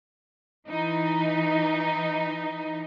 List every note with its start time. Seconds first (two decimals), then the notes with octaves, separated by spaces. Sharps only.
0.67 E3 D#4